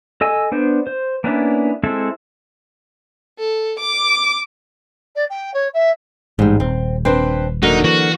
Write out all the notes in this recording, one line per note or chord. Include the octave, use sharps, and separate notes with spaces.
A4 D#5 G#5 E6
B3 D4 C5
C5
A#3 B3 C#4 D4 E4
G#3 C4 E4 A4 C5
A4
D6
D5
G5
C#5
E5
A1 G#2 G3
D#1 C4
C4 D4 B4 C5
D3 F#3 A#3 D#4
E3 F#4